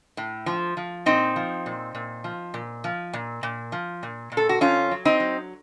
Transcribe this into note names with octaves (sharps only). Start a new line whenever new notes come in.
A2
F3
F3
A#2 C4 D#4
F3
A#2
A#2
F3
A#2
F3
A#2
A#2
F3
A#2
A#2
A4
F#4
F2 C#4 F4
F#3
C4 D#4
F#3